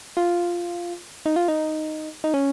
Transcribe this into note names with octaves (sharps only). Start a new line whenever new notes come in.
F4
D#4
F4
D#4
D#4
C#4